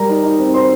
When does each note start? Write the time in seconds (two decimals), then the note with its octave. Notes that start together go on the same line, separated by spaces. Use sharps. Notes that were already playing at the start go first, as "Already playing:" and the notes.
Already playing: G3 A#4 A#5
0.09 D#4
0.23 D#4
0.39 C4
0.54 D#4 C5 C6